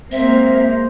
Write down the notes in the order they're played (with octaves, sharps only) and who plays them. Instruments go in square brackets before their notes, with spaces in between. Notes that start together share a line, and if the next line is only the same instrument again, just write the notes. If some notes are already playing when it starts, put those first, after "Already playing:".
[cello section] G#3 A#3 [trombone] C4 [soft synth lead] C5 [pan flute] E5